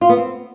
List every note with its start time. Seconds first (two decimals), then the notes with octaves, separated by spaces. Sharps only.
0.01 F4
0.09 B3
0.17 C4